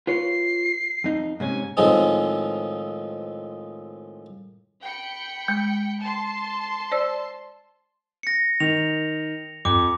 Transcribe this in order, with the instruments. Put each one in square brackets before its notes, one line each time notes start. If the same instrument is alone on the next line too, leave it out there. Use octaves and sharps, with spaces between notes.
[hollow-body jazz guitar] F4 B4 C#5 [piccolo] C7
[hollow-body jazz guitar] F2 D#4
[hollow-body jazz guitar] G#2 C3 C#4 [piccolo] G#5
[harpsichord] A2 D#3 F3 G#3 C4 D#4
[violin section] G5 B5 C#7
[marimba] G#3
[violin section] A5 C6
[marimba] C5 D5 E6
[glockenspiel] A#6 C#7
[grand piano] D#3 [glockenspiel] F7
[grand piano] F2 [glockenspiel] D6